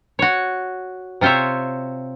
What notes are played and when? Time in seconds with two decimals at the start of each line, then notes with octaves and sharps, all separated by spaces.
0.19 F#4 C#5
1.21 C3 F4 C5 C#5 E5